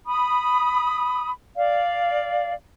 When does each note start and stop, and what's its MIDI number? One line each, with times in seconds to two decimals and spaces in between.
0.07 1.30 83
0.07 1.30 87
1.56 2.52 74
1.56 2.52 77